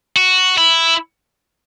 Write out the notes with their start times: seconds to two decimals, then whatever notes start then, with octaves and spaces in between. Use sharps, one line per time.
0.16 F#4
0.58 E4